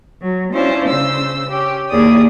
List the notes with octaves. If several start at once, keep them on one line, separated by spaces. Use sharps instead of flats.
F#3
C#4 D4 E4 F4 C5
C#3 C5 E6
C#4 G4
D#2 A#3 E4 G#4 D5 D#6